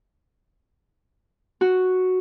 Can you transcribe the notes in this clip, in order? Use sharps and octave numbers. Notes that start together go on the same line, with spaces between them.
F#4